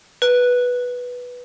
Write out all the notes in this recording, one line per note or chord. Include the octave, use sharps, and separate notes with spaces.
B4